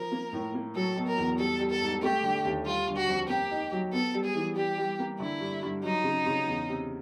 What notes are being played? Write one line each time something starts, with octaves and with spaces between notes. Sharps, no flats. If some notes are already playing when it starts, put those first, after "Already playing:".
Already playing: F3 A#4
A#3
A2
A#3
F#3 A4
B2
A#4
E2
G3 A4
G3
A4
G#2
A3 G4
D3
D#2
G3 F4
D3
F#4
F2
A#3 G4
D#4
F#3
B3 A4
G3
G#4
E3
G3 G4
G3
A#3
D3 E4
G2
G2
F#3 D#4
C#3
C#3
E2
C3